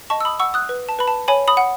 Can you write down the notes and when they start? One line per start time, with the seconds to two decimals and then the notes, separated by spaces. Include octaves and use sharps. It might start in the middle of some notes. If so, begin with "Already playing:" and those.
0.10 D#5 A5 C#6
0.20 E6
0.25 B5 D#6
0.40 F#5 C#6 E6
0.54 D#6 F#6
0.69 B4
0.89 A5
0.99 B4 B5
1.08 A5
1.28 C#5 G#5 B5
1.48 B5 D#6
1.57 F#5